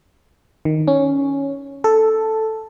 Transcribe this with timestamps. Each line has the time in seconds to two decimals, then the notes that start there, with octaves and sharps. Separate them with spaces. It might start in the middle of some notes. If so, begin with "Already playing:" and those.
0.65 D#3
0.88 C#4
1.84 A4